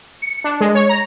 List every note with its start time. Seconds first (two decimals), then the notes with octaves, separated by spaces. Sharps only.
0.22 C#7
0.44 D4
0.61 G#3
0.75 C#5
0.89 A#5